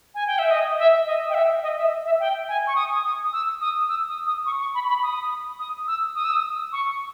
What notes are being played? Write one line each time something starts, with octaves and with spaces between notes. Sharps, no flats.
G#5
G5
E5
D#5
E5
D#5
G5
E5
D#5
E5
E5
G5
G#5
C#6
D#6
D#6
E6
D#6
E6
D#6
D#6
C#6
C#6
B5
B5
D#6
D#6
E6
D#6
E6
D#6
C#6